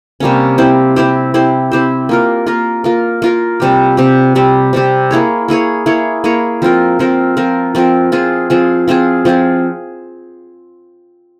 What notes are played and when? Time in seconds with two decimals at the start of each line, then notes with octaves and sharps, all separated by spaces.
0.20 C3 G3 A#3 C#4
0.58 C4 E4 G4 C5
0.96 C4 E4 G4 C5
1.34 C4 E4 G4 C5
1.72 C4 E4 G4 C5
2.09 A#3 F4 A#4
2.47 A#3 F4 A#4
2.84 A#3 F4 A#4
3.22 A#3 F4 A#4
3.60 C3 G3 C4 G4
3.97 C3 G3 C4 G4
4.35 C3 G3 C4 G4
4.73 C3 G3 C4 G4
5.11 A#3 E4 G#4 C#5
5.48 A#3 E4 G#4 C#5
5.86 A#3 E4 G#4 C#5
6.24 A#3 E4 G#4 C#5
6.62 F3 C4 F4 A#4
6.99 F3 C4 F4 A#4
7.37 F3 C4 F4 A#4
7.75 F3 C4 F4 A#4
8.12 F3 C4 F4 G#4
8.50 F3 C4 F4 G#4
8.88 F3 C4 F4 G#4
9.25 F3 C4 F4 G#4